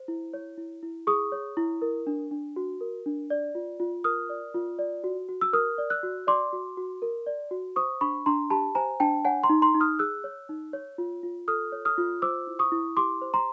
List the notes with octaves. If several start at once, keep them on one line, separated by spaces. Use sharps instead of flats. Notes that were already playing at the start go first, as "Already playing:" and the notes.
Already playing: C5
E4
C#5
E4
E4
G#4 C#6 D#6
C#5
E4
A#4
D4
D4
F#4
A#4
D4
D5
F4
F4
A#4 D#6 F6
D5
F4
D5
F#4
F#4
E6
A#4 D#6 F6
D5
E6 F#6
F#4
D5 C6 D6
F#4
F#4
A#4
D5
F#4
C5 C#6 D#6
D4 B5 C#6
D4 A#5 C6
G4 A5 B5
C5 G#5 A#5
D4 G5 A5
C#5 F#5 G#5
A#5 C6
D#4
A#5 C6
D#4
D#6 F6
G#4 E6 F#6
C#5
D#4
C#5
F4
F4
A4 D#6 F6
C#5
D#6 F6
F4
C5 D6 E6
E4
C#6 D#6
E4
G4 C6 D6
C5
A#5 C6